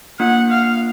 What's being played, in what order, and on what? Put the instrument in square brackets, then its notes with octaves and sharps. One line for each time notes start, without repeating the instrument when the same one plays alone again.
[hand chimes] A#3 D4 F4 [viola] F#5
[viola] F5